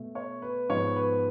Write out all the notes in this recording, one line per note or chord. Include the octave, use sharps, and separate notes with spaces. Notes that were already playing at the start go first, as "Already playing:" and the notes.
Already playing: B2 A3
C#5
B4
G#2 F3 B3 C#5
B4